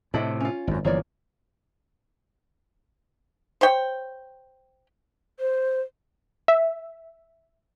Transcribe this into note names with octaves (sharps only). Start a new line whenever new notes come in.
A2 C3 D4 E4 D#5
C#4 F4
G#1 F#2
G1 E3 F3 A#3 C#5 D5
C5 C#5 G5
C5
E5